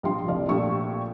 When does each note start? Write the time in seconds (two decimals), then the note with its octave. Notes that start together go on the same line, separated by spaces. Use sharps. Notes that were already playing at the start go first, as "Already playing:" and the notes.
0.03 A#1 G3 F5 C6
0.27 F1 C2 D5 F5
0.49 A#1 A#2 A3 G4 C#6 E6